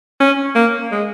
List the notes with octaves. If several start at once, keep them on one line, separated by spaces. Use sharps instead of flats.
C#4
A#3
G#3